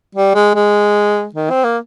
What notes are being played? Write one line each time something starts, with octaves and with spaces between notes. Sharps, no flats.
G3
G#3
G#3
D#3
C4
A#3